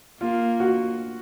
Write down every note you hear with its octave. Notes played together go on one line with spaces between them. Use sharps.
A#3 F4
F#4